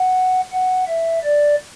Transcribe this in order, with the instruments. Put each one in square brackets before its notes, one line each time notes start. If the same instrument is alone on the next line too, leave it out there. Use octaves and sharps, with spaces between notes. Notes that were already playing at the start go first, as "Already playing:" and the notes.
Already playing: [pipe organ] F#5
F#5
E5
D5